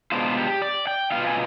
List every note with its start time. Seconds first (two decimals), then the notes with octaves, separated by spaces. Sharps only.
0.12 B2 G#3 B3 D4 F4 C5
0.37 G4
0.62 D5
0.87 G5
1.12 B2 G3 B3 F4 F5
1.27 G#5